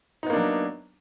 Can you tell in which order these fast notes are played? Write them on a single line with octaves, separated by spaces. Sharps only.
D#4 B3 A#3 D4 F#3